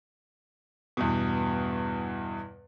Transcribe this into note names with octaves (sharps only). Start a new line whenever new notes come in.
E2 G2 B2